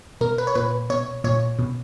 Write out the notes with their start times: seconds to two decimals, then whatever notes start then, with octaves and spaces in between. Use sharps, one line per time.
0.21 B2 A#4
0.38 B4
0.47 C#5
0.55 A#2 B4
0.90 B2 C#5
1.24 A#2 C#5
1.59 B2